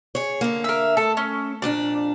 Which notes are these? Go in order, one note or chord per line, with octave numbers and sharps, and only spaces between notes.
G#4 C#5
D3 A#3
A#4 E5
A3 A4
C#4
F2 A#2 D4 D5